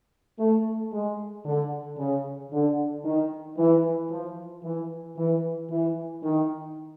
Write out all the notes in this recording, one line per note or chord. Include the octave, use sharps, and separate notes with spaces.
A3
G#3
D3
C#3
D3
D#3
E3
F3
E3
E3
E3
D#3